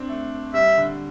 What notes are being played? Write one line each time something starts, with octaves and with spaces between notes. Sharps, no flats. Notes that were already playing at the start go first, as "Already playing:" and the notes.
Already playing: C4 D4
A3
G3 E5
D3